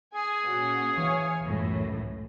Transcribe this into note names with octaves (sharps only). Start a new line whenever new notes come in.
G#4 G#5
A#2 C#4 F#4
E3 C#5 F5 G#5
C#2 F#2 A2